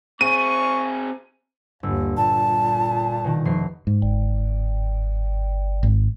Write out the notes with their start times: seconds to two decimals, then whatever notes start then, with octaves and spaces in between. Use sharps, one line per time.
0.21 C4 G#4 C#6 D#7
1.83 G1 D#2 E6
2.17 A#2 A5
3.24 B2 D#3
3.45 F1 C7
3.87 G#2
4.02 G1
5.83 G#1